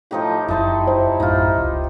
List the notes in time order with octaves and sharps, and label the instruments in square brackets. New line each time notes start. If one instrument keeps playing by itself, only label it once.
[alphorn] A2 [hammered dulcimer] F3 D#4 G4
[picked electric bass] F#1 F2 [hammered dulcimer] D#4 A5 C6 [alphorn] E4
[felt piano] C5
[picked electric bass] A#1 F#2 A2 [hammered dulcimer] D#4 F4
[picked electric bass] F1 C#2